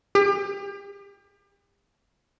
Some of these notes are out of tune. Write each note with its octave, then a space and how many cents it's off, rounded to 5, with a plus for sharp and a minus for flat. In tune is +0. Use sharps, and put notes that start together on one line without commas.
G4 +40